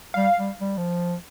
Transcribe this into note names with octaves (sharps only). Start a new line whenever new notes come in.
G3 F5
G3
G3
F3